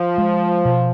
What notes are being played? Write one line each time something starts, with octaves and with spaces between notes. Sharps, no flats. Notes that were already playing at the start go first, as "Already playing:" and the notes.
Already playing: F3
G#3
B2